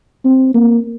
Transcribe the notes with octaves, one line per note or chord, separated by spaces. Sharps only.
C4
A#3